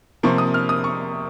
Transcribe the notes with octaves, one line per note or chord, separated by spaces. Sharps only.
C3 F3 A#3 C#6
D#6
F6
D#6
C#6